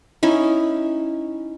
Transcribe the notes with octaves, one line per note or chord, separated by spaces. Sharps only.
C#4 D#4 E4